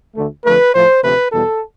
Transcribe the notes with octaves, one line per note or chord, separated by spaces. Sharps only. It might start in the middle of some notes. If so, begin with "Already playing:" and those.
D2 D3 A3
F2 D3 F3 A3 B4
A2 F3 A3 C5
D2 C3 F3 A3 B4
E2 B2 G3 A4